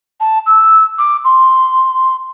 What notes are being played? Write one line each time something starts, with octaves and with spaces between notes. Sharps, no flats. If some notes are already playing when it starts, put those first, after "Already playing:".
A5
E6
D6
C6